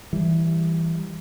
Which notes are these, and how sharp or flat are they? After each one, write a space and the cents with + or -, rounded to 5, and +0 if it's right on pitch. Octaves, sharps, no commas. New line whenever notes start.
E3 +0 G3 +0